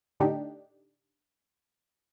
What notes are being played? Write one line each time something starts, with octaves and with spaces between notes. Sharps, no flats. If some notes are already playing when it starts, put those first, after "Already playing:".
A2 D3 D4 D#4 G4